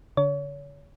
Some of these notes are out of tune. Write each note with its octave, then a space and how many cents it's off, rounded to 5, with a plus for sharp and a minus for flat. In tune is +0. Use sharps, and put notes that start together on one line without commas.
D3 -30 C#5 +35